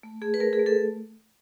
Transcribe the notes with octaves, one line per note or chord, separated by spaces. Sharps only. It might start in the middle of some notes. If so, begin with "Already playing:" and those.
A3
A3 G#4
B4
A3 A#4
G#4
A3
A4